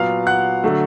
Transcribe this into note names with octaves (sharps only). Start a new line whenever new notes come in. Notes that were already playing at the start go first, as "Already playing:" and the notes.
Already playing: A#2 F#3 B3 F5 F6
F#5 F#6
D3 F#3 A3